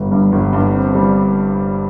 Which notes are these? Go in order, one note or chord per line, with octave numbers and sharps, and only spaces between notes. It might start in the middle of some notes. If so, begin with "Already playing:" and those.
Already playing: G1 G3
G2
G1
G2
C4
G3